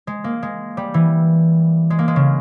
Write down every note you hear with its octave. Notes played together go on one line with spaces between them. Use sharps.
G#3
A#3
G#3
G3
E3
G#3
A#3
G#3
C#3